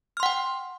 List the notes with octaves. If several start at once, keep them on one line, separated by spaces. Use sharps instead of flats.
F#5 G5 C6 F6